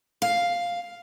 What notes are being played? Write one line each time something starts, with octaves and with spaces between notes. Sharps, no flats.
F5